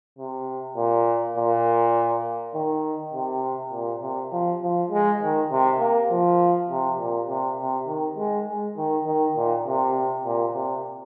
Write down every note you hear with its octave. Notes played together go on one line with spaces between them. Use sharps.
C3
A#2
A#2
D#3
C3
A#2
C3
F3
F3
G#3
D#3
C3
A#3
F3
C3
A#2
C3
C3
D#3
G#3
G#3
D#3
D#3
A#2
C3
A#2
C3